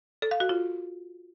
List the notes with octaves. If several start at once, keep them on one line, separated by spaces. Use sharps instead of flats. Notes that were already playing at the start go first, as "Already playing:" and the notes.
A4
F5
F#4
F4